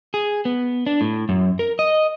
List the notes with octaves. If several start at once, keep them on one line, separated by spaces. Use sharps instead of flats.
G#4
B3
D4
A2
F#2
A#4
D#5